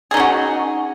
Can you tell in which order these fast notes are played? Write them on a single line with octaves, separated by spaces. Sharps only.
G#4 D#4 C#4 F#4